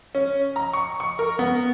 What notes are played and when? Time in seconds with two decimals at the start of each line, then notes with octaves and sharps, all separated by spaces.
0.15 C#4
0.56 A#5
0.73 C#6
1.00 C#6
1.19 A#4
1.39 B3